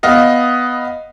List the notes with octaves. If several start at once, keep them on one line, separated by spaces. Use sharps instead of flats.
B3 D#5 F5